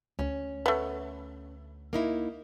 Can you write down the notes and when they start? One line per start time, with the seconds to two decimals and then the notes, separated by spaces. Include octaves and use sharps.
0.19 D2 C#4
0.66 A3 B3
1.93 A#3 D#4 E4